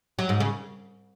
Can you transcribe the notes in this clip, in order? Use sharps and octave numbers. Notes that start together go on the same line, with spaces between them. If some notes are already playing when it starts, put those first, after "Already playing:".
F#3
G#2
C#3